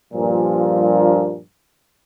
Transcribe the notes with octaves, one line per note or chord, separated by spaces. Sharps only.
G2 A#2 F3